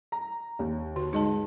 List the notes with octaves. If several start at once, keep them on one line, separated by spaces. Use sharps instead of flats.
A#5
D#2
D3 F#4
G#2 D#4 D#5 A5